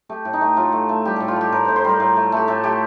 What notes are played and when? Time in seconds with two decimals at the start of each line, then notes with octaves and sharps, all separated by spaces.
0.09 A3 G4
0.25 A2
0.33 D#4
0.41 A3
0.57 A2 F4
0.73 A3
0.89 A3
1.05 G3 G4
1.16 A2 A4
1.28 F4
1.36 G3 G4
1.52 A2 A#4
1.65 A2 C5
1.76 C5
1.85 G3 A#4
2.00 A2
2.16 A3
2.32 A3 G4
2.48 A2 A4
2.63 A3 G4